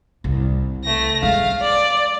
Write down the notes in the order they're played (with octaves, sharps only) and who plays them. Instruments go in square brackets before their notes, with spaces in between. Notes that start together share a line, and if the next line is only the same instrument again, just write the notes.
[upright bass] C2
[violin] A3 A#6
[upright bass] G#3 [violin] F5
[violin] D5